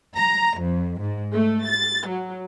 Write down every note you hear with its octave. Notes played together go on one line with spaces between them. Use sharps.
A#5
F2
G#2
A3
A6
F#3